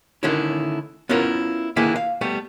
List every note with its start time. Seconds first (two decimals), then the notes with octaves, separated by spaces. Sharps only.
0.23 D3 D#3 A3 C#4 E4
1.09 B3 C#4 E4 F4 A#4
1.76 D3 D#3 A#3 E4 G#4 B4
1.96 F5
2.21 G3 A3 B3